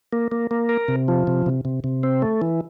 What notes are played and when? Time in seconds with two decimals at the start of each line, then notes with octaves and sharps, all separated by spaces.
0.13 A#3
0.32 A#3
0.51 A#3
0.69 A#4
0.88 C3
1.08 F3
1.27 C3
1.46 C3
1.65 C3
1.84 C3
2.03 C4
2.22 A3
2.42 E3